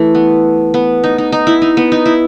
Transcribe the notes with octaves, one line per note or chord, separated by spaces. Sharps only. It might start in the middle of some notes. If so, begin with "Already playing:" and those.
Already playing: E3 A3
B3
B3
D#4
D#4
D#4
E4
D#4
B3
D#4
E4